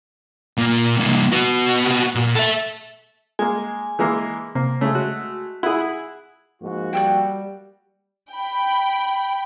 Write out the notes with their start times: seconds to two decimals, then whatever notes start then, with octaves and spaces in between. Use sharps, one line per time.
0.57 A#2 A#3
1.00 C2 A#3
1.32 B3 F#4
2.15 A#2
2.35 A4 E5
3.39 G#3 A#3 G#5
3.99 E3 G#3 A#3
4.55 C3 A#3
4.81 C#3 G#3 A3
4.95 F#4
5.63 E4 G#4 F#5
6.62 G#2 F3 A#3 F#4
6.93 G3 G5 E6 F#6
8.33 G5 B5